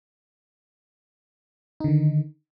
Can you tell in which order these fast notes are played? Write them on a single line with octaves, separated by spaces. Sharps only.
D#4 D3 D#3